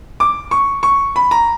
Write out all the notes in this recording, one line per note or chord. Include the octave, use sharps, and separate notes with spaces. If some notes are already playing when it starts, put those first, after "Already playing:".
D6
C#6
C#6
B5
A#5